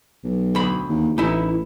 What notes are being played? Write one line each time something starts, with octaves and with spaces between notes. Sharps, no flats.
B1
D2 B5
D#2
A1 D#4 E4